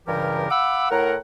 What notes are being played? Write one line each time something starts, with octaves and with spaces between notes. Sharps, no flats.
C#2 G2 C#3 E3 G4 A#4
F5 F#5 B5 D6 E6
A2 A#4 F#5 A#5